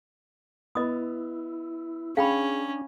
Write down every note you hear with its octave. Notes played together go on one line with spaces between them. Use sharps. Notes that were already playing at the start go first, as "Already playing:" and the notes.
B3 E4 D#5 D#6
C#4 D4 G#4 F5 G5 B5